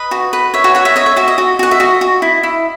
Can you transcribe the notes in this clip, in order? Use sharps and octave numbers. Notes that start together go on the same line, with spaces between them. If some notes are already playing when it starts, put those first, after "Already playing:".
Already playing: B4 D#5
F#4
B4
C#5 E5
F#4 F#5
F#4 C#5 F#5
E5
C#5 D#5
E5
F#4 E5
D#5
F#4
F#4 F#5
E5
F#4 D#5
F#4
E4
E4